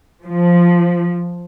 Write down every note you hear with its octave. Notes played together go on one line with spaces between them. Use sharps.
F3